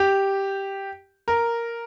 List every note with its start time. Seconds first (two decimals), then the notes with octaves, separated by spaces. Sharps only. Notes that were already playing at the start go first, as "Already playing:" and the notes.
Already playing: G4
1.28 A#4